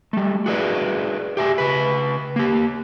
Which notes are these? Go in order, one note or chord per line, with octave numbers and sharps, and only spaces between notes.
G3 A3
F#4 G#4 B4 D5
G4 E5 G#5
C#3 B4
A#3 G4